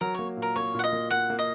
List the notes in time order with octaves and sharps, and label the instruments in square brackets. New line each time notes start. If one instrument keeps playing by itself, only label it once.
[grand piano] F#3 [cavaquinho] A#4
[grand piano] A#3 [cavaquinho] C#5
[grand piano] A#2
[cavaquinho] A#4
[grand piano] A#3 [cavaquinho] C#5
[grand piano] A#2 [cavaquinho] F#5
[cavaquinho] D#5
[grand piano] A#3
[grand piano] A#3 [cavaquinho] F#5
[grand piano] A#3
[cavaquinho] D#5